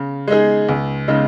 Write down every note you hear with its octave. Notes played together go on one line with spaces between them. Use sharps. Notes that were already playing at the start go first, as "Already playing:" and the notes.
Already playing: C#3
G#3 D#4 G#4
C#2
C#3 G#3 D#4